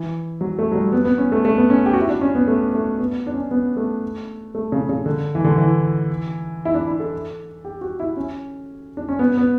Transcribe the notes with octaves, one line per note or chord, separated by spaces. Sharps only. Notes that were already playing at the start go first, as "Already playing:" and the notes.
Already playing: E3
F#3
A3
F#3
G3
B3
B3
C#4
A3
A3
B3
C#4
G4
F#4
E4
D4
C#4
B3
A3
A3
B3
D4
C#4
B3
A3
A3
C#3
C#3
D3
E3
D3
E3
E4
D4
E4
A4
G4
F#4
E4
C#4
D4
C#4
B3
B3